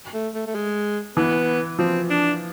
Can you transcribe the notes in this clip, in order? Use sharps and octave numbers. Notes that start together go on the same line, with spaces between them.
A3
A3
A3
G#3
E3 B3
F3 C4
D4